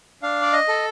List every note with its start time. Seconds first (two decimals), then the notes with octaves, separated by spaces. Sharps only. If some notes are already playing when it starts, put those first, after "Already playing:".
0.22 D4 F5
0.42 D5
0.53 D#5
0.68 A4